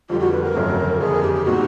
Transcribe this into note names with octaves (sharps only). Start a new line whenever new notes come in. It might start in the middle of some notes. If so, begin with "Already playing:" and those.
F2 D3 G3 F4
F#4
B4
A#4
G1 F2 C#3 F#3 A3
F#1 F2 D3 G#4
G4
G4
A#2 G3 C4 D#4 F#4